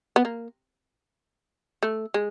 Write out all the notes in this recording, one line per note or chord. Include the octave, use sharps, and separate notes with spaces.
B3
A#3
A3
G#3